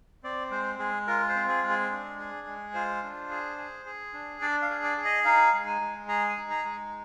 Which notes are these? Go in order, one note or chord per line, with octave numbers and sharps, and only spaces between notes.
C4 D5
G#3 C5
G#3 G#4
F4 A#4
C5
C4
G#4
G#3
G#4
D4
G#4
G#3
F4 C5
D4
G#4
G#4
G#4
D4
D4 D5
F5
G#4
D5
G#4
D#5
D#4 F5
G#3
G#5
G#3
G#4 A#5
G#5
D#4
A#5
G#3